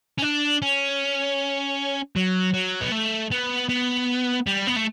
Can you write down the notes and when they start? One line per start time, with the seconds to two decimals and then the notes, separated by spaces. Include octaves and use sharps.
0.19 C#4
0.23 D4
0.62 C#4
2.16 F#3
2.54 F#3
2.81 B3
2.92 A3
3.32 B3
3.69 B3
4.46 G3
4.67 B3
4.76 A3